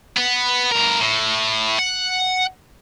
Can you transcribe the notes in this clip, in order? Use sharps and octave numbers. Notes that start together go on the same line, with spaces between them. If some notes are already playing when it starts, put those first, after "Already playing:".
B3 B4
G2 A#4
A2
F#5